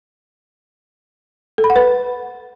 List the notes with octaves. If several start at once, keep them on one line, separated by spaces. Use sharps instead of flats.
A4
B5
F#5
B4